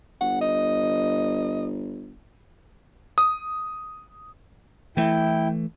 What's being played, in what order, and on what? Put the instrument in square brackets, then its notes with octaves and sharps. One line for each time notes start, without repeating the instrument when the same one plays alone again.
[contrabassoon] G1 [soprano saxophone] F#5
[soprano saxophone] D#5
[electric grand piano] D#6
[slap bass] E3 A3 [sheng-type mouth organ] E4 G5